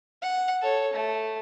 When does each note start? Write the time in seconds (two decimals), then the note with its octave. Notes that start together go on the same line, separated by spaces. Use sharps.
0.22 F#5
0.61 A4 C#5
0.93 A3